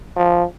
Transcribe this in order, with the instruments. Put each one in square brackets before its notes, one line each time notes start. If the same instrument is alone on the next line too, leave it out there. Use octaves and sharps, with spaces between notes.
[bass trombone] F3